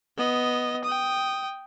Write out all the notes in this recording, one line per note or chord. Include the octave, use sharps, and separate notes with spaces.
B3 D#5
G5 D#6